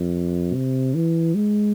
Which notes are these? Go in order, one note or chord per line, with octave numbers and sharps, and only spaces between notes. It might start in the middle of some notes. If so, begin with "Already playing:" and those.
Already playing: F2
C3
E3
G#3